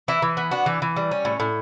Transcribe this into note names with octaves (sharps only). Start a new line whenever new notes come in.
E3 E4
E3
B3
D4 F#4
E3
E3
G3
C#4
A2
A2